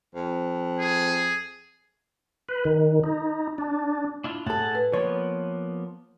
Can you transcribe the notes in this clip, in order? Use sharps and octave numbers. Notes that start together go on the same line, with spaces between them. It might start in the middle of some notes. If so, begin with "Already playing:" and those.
F2
G#4
B4
D#3
D#4
D4
D4 E4 F4
A2 G#4 A4 F#5 A5
B4
F3 A#3 B3 C#5